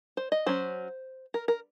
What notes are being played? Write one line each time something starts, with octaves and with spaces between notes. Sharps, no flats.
C5
D#5
F#3 C#4 C5
A#4
A#4